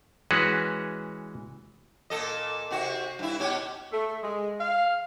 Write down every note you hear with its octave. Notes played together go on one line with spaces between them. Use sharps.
E3 G#3 C#4 F#4 G#4 B4
A#2 A4 D#5
C3 F#4
G2 E4
B2 C#4 G4
A3
G#3
F5